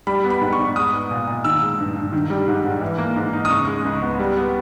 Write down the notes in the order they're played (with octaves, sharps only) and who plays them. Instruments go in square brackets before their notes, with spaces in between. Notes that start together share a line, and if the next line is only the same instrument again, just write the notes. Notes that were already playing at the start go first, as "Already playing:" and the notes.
[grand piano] G3 B5
B3
B5
G#2
C#6
G#2
G#3 D#6
B3
A#2
A#2
D#3 E6
G#3
G2
G2
D#3
G3
G#2
G#2
E3
A#3
G#2
D#4
D#6
C#3 C#6
G#3
C#2
B3
G3
B3